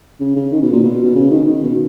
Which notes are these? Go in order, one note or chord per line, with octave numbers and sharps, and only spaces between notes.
C#3
C#3
D#3
B2
A#2
B2
B2
C#3
D#3
D#3
B2